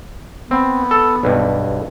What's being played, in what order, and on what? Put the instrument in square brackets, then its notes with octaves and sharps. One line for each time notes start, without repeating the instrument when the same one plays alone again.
[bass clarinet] B3 [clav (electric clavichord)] C4
[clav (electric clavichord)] A4
B1 G2